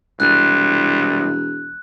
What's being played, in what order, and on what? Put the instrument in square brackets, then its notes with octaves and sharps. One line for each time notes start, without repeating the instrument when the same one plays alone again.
[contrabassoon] E1 [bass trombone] C2 [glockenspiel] F#6